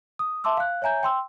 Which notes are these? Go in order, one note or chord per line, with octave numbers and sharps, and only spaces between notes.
D#6
E5 A5 C6 D6 E6
F5 F#6
C#5 E5 G#5 A#5 G6
G5 C6 E6